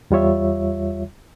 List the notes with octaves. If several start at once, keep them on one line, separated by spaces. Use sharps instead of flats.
E2 G3 F4 C#5 E5